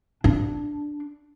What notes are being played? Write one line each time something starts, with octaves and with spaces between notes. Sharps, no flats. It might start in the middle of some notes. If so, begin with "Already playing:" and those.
D4